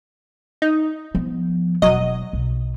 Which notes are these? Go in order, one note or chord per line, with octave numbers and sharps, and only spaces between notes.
D#4
F3 B3
E1 F#3 D#5
B1